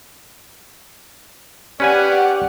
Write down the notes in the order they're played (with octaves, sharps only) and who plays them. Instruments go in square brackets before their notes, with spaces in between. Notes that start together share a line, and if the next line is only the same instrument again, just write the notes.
[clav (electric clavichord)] C#4 B4 G#5 [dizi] G4 [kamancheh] D5 F#5